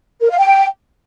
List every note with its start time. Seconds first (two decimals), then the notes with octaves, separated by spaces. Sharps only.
0.21 A#4
0.30 F5
0.39 G5